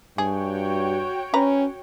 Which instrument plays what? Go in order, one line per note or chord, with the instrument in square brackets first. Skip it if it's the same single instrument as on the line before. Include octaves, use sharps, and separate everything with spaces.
[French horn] G2 [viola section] F#4 C#5 G5 [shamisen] G#4
[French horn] C#4 [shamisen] B4 A#5